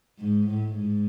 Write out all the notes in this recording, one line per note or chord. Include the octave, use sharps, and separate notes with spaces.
G#2
A2
G#2